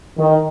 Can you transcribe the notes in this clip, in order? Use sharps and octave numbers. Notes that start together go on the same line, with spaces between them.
D#3